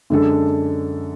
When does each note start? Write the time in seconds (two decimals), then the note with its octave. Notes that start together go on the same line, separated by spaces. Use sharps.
0.10 F#2 D3 G#3 D4 A4